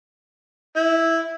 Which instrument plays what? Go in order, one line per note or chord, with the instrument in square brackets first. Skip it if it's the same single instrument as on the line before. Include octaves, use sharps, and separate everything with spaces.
[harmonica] E4